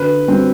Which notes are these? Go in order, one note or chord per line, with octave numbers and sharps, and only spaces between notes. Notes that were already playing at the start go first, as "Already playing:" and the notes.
Already playing: D3 B4
G3 C4